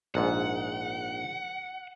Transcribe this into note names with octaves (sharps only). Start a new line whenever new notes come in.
A#1 G#2 F#5